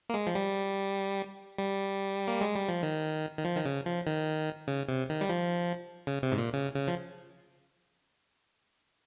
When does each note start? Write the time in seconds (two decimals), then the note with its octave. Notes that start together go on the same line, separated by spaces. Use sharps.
0.09 A#3
0.14 G#3
0.27 F3
0.35 G3
1.58 G3
2.28 A#3
2.41 G#3
2.56 G3
2.69 F3
2.83 D#3
3.38 D#3
3.45 F3
3.55 D#3
3.65 C#3
3.86 F3
4.07 D#3
4.68 C#3
4.89 C3
5.09 D#3
5.21 G3
5.29 F3
6.07 C#3
6.23 C3
6.32 G#2
6.38 A#2
6.53 C#3
6.74 C#3
6.87 F3